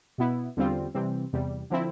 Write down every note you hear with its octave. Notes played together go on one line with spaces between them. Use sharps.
B2 B3 E4
E2 D3 G3 C4 F4
C3 E3 G3 C4
E2 C3 G3
D3 F3 C4 E4